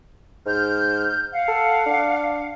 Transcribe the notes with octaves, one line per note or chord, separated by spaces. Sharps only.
G#2 F6 G6
F5 F#5
A4
D4